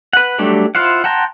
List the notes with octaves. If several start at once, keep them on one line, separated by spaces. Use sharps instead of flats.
B4 F#5
F#3 G3 A3 D4 G4
E4 F4 C5 F5 F#5
F#5 G5 A5 A#5 C6